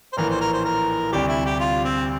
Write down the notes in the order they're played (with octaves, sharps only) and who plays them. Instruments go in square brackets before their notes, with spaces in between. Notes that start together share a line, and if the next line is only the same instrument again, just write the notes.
[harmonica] C5
[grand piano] A#1 A2 E3 A#3 [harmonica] A#4
[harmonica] C5
A#4
C5
A#4
[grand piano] D2 C3 G3 [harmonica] G4
[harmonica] E4
G4
F4
C4